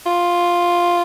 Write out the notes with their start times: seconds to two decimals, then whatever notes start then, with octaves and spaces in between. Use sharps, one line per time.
0.06 F4